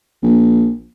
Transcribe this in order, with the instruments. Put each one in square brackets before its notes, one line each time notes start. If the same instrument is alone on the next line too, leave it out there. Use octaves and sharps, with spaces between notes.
[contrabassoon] A#1